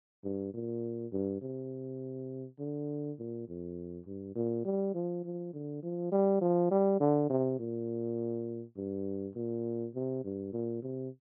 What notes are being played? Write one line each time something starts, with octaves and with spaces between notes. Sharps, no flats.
G2
A#2
G2
C3
D3
A#2
F2
G2
A#2
G3
F3
F3
D3
F3
G3
F3
G3
D3
C3
A#2
G2
A#2
C3
G2
A#2
C3